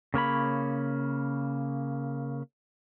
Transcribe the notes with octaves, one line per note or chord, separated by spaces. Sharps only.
C#3 A#3 C#5 B5